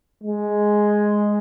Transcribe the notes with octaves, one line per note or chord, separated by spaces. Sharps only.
G#3